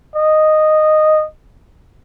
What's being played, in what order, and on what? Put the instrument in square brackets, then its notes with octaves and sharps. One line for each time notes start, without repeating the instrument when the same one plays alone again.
[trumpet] D#5